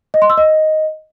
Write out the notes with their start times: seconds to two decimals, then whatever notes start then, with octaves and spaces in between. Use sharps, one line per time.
0.14 D#5
0.22 C6
0.30 E6
0.37 D#5